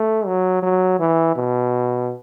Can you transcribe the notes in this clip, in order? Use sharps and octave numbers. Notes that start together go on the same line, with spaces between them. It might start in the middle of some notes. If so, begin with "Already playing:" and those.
Already playing: A3
F#3
F#3
E3
B2